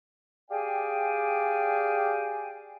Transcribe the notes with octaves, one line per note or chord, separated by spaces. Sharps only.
G4 G#4 D5 F5 G5 G#5